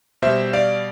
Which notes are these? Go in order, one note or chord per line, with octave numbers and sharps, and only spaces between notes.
B2 G3 C5 E5
D5 F5